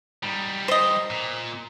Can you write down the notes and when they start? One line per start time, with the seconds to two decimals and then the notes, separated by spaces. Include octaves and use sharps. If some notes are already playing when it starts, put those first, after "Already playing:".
0.23 G3 D#4
0.68 C5 D#5
1.10 A#2